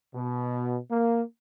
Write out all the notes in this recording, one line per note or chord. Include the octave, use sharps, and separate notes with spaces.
B2
A#3